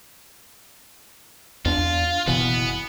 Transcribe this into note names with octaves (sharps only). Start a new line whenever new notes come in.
E2 D4 F4
F#1 B2 E3 B3